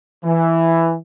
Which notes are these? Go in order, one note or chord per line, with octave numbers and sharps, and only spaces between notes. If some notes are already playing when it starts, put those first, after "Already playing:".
E3